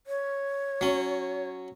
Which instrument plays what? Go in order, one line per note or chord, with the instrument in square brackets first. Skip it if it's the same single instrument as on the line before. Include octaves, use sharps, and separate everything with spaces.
[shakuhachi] C#5
[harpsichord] F#3 C#4